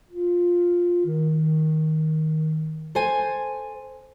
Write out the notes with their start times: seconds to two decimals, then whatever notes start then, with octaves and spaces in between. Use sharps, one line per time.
0.11 F4
1.06 D#3
2.95 A4 C5 G#5